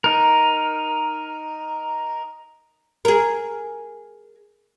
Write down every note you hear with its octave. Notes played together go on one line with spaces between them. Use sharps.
D#4 A#4
G#4 A#4